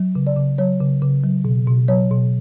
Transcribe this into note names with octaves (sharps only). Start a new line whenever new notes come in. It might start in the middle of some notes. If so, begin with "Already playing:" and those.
Already playing: F#3
C#3
D5
C#3
F#3 C#5
C#3
C#3
F#3
B2
B2
F#3 C#5
B2